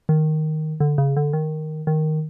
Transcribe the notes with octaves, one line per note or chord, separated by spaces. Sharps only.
D#3
D3
C#3
D3
D#3
D#3